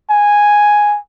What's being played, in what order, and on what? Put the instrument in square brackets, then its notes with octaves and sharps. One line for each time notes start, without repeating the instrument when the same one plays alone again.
[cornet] G#5